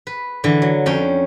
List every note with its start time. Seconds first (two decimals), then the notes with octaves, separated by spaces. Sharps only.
0.07 B4
0.44 D3 E3
0.62 F#3
0.86 F2 C#4 G5